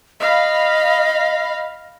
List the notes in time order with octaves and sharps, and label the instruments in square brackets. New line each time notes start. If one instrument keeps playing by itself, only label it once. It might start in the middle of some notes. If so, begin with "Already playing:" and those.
[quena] D#5 [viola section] F5 B5